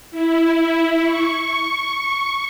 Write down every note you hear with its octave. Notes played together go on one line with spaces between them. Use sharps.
E4
C#6